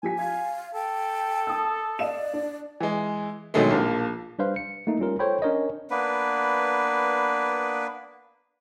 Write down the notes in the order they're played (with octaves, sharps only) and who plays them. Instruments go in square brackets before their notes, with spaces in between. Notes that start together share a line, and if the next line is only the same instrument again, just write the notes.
[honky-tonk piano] F3 G4 B6 [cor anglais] G#5
[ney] F5 [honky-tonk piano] G#6
[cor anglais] A4 [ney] G5
[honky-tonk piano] A5 D#6 E6
[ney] D5 [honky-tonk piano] D#5 F5 E7
[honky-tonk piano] D4
[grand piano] E3 G#3
B2 D3 D#3 F#3 G#3 A3
A#1 F3 A#3
[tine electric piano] G3 D4 B4 C5 F5
C#7
A3 A#3 D#4
G3 C#4 F4 A#4
A4 C5 C#5 G5 B5
C#4 D4 A#4 C#5 D#5
[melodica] A#3 B3 D4 B4